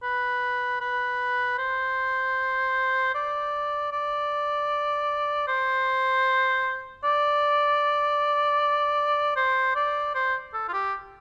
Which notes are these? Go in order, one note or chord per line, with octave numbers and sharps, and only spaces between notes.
B4
B4
C5
D5
D5
C5
D5
C5
D5
C5
A4
F4
G4